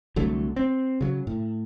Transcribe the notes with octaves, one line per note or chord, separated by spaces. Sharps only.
C2 D3 F#3 A3
C4
C#3 F#3
A2